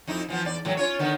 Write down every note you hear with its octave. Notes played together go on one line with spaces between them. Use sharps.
F2 D#4 E4
E3 F3 B3
E2 D5
A2 E3 F#3
C#4 F4 C#5
D3 D#3 B3